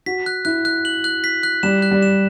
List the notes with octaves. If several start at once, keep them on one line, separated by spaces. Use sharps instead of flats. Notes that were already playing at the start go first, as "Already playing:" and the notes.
F#4 B6
F#6
E4 F#6
F#6
F#7
F#6
B6
F#6
G3 E7
F#6
G3
E7